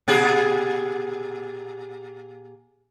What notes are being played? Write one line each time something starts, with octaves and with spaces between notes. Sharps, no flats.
A#2 G4 G#4